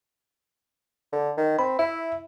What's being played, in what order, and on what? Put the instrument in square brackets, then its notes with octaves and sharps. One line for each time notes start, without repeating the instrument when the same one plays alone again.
[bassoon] D3
D#3
[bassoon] C4 [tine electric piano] B5
[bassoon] E4 [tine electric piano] E5